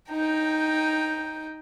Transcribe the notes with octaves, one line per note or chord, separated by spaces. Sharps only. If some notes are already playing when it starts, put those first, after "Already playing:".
D#4 G5